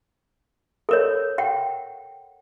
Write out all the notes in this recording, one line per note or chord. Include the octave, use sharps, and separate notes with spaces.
A4 A#4 C#5
F#5 G5